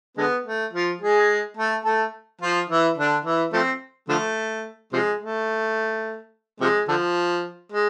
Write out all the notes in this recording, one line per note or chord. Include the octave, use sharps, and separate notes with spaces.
D3 G#3 B3
A3
F3 F4
G#3 G#4
A3 A4
A3 A4
F3 F4
E3 E4
D3 D4
E3 E4
F3 A3 C4
D3 F3 A3
C3 F3 G#3
A3
C3 F3 G#3
D3 F3
G#3